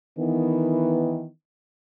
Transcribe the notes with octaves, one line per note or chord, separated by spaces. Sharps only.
D#3 E3 B3